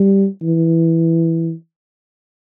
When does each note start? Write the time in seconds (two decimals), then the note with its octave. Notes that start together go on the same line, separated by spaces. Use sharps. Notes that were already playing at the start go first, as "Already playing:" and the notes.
Already playing: G3
0.43 E3